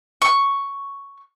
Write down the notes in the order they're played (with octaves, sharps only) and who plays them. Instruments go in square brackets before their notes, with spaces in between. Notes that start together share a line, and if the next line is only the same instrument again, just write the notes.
[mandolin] C#6